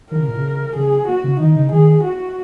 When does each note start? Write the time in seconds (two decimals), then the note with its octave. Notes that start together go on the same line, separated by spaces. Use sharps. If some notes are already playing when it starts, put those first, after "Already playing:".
0.11 D#3 A#4
0.20 C#3
0.28 A#2
0.37 C#3
0.76 C#3 G#4
1.08 A#3 F#4
1.24 C#3
1.40 D#3 D#4
1.56 C#3
1.71 D#3 G#4
2.04 F#4